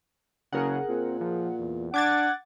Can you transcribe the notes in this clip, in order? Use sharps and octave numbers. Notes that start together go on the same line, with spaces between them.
F#1 C#3 G#4 A#4 F#5
A#2 C4
F3
E2
D4 F#5 D6 G#6 A6